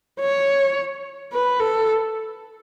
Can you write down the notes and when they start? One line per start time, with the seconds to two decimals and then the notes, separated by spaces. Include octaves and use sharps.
0.20 C#5
1.32 B4
1.60 A4